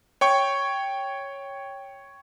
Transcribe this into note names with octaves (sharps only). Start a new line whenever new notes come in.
C#5 G5 C#6